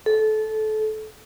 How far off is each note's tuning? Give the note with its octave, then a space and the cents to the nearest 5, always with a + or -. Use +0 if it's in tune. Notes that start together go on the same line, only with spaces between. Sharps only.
A4 -20